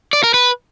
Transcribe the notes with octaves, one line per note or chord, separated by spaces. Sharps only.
D5
A#4
B4